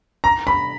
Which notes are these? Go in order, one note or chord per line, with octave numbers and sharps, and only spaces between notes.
A#5
B5